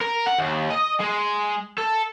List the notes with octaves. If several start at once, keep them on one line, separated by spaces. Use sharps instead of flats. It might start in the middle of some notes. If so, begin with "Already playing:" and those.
A#4
F#5
D#2
D#5
G#3
A4